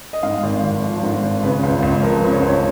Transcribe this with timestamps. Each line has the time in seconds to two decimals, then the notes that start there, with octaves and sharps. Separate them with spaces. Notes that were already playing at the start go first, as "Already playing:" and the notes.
0.13 D#5
0.23 G#2 F5
0.43 G#1
0.63 G#1
0.83 F3
1.03 G#2
1.23 G#1
1.43 C#3 B4
1.63 C#2
1.83 C#2
2.02 F3 A#4
2.17 B4
2.23 C#3
2.32 C#5
2.42 C#2
2.48 C#5